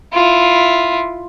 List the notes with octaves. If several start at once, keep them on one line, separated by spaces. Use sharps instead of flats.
E4 F4